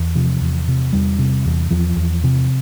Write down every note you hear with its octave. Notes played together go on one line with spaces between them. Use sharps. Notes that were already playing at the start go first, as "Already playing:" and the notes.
Already playing: E2
C3 F3
E2
C3
E2 G3
C3
E2
E2 F3
E2
C3